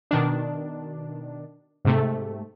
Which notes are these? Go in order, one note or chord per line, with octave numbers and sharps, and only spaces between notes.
B2 D#3 D4
G#2 C3 A3